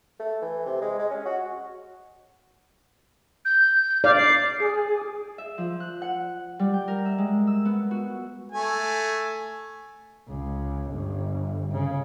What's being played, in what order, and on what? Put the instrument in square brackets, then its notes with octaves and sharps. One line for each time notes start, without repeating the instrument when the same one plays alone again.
[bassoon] A3
E3
C3
G#3
G#3
C#4
F#4
[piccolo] G6
[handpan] D5 [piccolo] F5
[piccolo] C7
[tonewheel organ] G#4
[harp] E5
F3
F#6
F#5
G3
G5
A#4
E5
G#3
E6
B3
F#4
[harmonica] A3 G#5
[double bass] C#2
G1
C#3